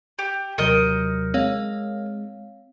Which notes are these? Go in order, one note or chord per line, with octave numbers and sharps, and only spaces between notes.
G4
D#2 C3 F#3 A#4 D#5 G6 C#7
G#3 C4 C#5 F5